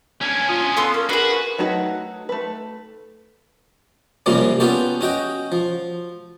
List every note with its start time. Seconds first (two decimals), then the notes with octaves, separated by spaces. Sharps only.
0.21 C#4 D4 G#5
0.49 F4 D#6
0.77 B3 A4 F5 C6 D#6
0.94 A#3 C#4 A#4
1.09 D4 F#4 G#4 B4
1.58 F#3 A3 D#4 F#4 B4
2.29 A3 B4
4.26 F#2 C3 F3 G3 A#3 C#4
4.60 B3 C#4 F4 G4 A4
5.01 C#4 F#4 D#5 G5
5.52 F3